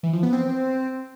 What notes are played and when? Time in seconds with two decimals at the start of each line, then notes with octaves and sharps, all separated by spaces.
0.03 E3
0.13 F3
0.23 B3
0.33 C4